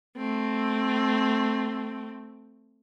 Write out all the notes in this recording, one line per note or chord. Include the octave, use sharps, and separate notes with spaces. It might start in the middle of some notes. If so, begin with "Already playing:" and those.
A3 C4